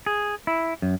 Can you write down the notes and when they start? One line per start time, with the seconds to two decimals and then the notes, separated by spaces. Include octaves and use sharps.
0.06 G#4
0.47 E4
0.82 F#2